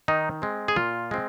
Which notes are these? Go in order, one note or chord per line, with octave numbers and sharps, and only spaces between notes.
D#3 D#4
G#3 C4
G#4
A#2 F4
G#3 C4